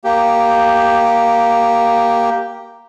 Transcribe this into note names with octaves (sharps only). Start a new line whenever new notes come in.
A#3 G4